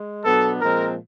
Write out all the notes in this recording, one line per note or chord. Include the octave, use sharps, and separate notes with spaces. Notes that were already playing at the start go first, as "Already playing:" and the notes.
Already playing: G#3
B2 F#3 B3 D4 A4
A#2 F3 G#3 C4 A#4